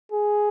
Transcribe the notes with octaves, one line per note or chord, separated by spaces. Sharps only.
G#4